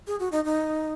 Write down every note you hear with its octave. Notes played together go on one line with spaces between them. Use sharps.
G#4
F#4
D#4
D#4